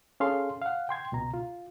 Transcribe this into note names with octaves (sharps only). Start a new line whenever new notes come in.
C#4 G#4 A4 F5 C6
F5 F#5
G5 C6 G#6
C#2 B2 A#5
F4